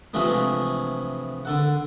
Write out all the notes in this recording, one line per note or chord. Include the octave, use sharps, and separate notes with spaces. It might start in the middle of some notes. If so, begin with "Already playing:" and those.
C3 E3 F3 G#3 A3 D4
D3 A4 F#5